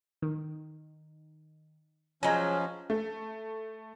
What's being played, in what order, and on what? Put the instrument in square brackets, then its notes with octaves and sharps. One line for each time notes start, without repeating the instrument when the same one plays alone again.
[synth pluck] D#3
[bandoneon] F3 C#4 [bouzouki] F#3 G#3 [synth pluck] G#5 A#5 G6
[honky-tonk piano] A3